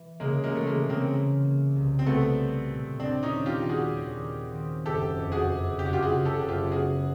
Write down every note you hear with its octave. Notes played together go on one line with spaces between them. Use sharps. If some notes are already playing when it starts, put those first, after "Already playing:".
Already playing: E3
C#3 G#3 A#3
G#3 A#3
E3 A3
G#3 A#3
C#3
A#3 C4
A#3
A#3
C2
C4
C2 A3 B3
G3
A#2
D#2 C4 D4
C#4 D#4
D#3
F4 G4
G3
F#4 G#4
D#2
D#3
C4
F#1 G4 A4
F2
F#4 G#4
F#1
F#1 G4
F#4
F4 G4
F#4 G#4
C#3
G4 A4
F#1
F4 G4
B3 F#4 G#4